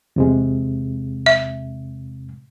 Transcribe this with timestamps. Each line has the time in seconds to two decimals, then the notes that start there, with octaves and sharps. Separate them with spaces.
0.16 E2 C3 G#3
1.26 E5